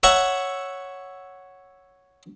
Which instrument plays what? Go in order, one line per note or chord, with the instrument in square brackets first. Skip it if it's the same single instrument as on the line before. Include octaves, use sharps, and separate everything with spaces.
[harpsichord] C#5 E5 F#5 A#5 C#6